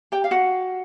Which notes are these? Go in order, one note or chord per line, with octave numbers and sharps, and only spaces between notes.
G4 G5
F5
F#4 F#5